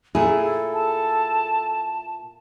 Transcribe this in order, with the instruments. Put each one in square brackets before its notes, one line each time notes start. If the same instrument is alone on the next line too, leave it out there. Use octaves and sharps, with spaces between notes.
[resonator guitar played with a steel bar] A#2 E4 [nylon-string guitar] G#4 [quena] A4
[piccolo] A5